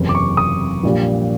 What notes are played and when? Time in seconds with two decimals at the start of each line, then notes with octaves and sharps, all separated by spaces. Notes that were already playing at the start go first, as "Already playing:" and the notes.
Already playing: F#1 E2 C3
0.09 D6
0.15 C#6
0.37 D#6
0.83 A#1 A#2 G3